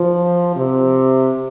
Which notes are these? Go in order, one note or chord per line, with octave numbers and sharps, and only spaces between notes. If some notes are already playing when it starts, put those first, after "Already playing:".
Already playing: F3
C3